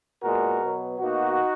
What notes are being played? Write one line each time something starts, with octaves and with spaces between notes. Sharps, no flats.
A#2 G#3 B3 F#4 A#4
B2 F#3 B3
B2 A#3 D#4 F#4